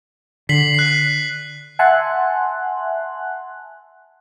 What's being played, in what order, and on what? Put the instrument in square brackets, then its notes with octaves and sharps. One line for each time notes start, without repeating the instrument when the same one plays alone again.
[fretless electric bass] D3 [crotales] B6 C7 F#7
[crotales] F#6 C7
[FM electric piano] E5 F#5 G#5 A5 C6 F#6